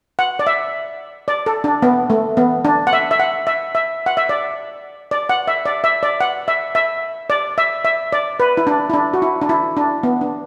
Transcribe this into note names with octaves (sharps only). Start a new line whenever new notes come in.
F#5
D5
E5
D5
A4
D4
B3
A3
B3
D4
F#5
E5
E5
F#5
E5
E5
F#5
E5
D5
D5
F#5
E5
D5
E5
D5
F#5
E5
E5
D5
E5
E5
D5
B4
E4
D4
E4
D4
F#4
E4
D4
E4
D4
B3
D4